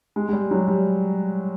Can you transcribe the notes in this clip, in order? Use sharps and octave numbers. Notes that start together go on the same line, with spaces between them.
G#3
G#3
G3
F#3
G3